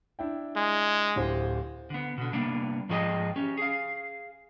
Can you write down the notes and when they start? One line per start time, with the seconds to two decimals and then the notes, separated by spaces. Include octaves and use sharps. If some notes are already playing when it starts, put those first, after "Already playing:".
0.19 D4 E4 G5
0.56 G#3
1.16 D1 G4 C5
1.90 D3 B3
2.18 B2 D3
2.33 C3 G3 A#3 B3 D4
2.89 G#2 F3 F4 G#4 D#5 G5
3.36 C#4 G4
3.57 G#4 F5